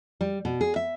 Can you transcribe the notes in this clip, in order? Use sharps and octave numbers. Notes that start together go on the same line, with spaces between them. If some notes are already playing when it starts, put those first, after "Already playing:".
G3
B2
G#4
E5